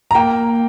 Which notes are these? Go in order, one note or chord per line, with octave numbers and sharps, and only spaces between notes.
A#5
A#3 G5